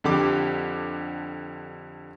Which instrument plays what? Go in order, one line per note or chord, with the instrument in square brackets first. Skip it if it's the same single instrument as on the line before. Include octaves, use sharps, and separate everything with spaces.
[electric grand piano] F2 D3 G4 D6